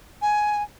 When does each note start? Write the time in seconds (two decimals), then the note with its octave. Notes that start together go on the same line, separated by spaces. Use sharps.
0.22 G#5